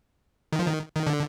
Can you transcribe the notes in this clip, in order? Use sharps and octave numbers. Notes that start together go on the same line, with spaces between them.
D#3
F3
D#3
D#3
D3